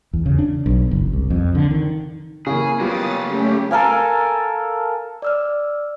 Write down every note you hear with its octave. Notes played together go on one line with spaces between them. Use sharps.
E2
C#3
D4
B1
F#1
C2
F2
D3
D#3
C#3 E3 A#3 G#4
C#3 F#3 G3 A#3 B3 F4 D#6 A6
A3 C#4 G4
A4 A#4 F5 G#5
D5 E6 F6